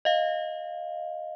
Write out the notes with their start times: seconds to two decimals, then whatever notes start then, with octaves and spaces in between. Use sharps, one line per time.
0.05 D#5 F5